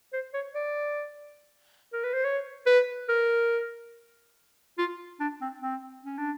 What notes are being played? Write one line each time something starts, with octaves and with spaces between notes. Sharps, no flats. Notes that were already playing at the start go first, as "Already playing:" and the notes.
C5
C#5
D5
A#4
B4
C5
C#5
B4
A#4
F4
D4
C4
C4
C#4
D4